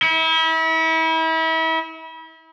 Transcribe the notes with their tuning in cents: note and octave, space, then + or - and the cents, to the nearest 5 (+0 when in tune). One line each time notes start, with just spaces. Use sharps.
E4 -35